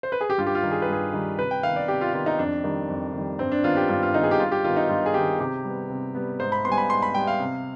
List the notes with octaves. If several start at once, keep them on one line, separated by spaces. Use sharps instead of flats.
C5
B4
G#4
G4
G2 F4
G4
F4
D#3 G3
G#4
B4
G2 G#4
D#3 G3
C3 B4
G5
D#3 B3 F5
D5
C3 G4
F4
D#3 B3 F4
D#4
F2 D4
D#3 G3
F2
D#3 G3
G2 C4
D4
D#3 B3 F4
G4
G2 F4
F4
D#3 B3 D#4
G#4
G4
G2 F4
G4
D#3 B3 F4
D#4
G2 F4
G#4
D#3 B3 G4
C3 G4
G3 B3
C3
G3 B3
G#2 C5
B5
G3 B3 G#5 C6
B5
G#2 C6
B5
G3 B3 G5
F5
C3